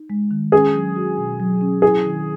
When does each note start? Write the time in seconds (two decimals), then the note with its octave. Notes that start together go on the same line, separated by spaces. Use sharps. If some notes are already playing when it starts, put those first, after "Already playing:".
Already playing: D#4
0.10 G#3
0.31 D#3
0.52 C#4 G#4
0.74 F#3
0.96 F#4
1.18 B2
1.40 F#3
1.61 C#4
1.82 E4 G#4
2.04 D#3